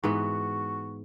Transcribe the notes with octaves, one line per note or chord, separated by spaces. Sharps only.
G#2 E3 B3 F#4